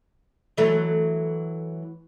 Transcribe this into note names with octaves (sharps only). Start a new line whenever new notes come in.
E3 F#3 A3